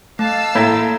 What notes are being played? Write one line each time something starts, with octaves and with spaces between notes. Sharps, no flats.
A3 F5 A5 E6
A2 A#3 A#5